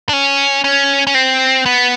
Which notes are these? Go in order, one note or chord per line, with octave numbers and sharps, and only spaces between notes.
D4
C#4
C#4
C#4
C4
B3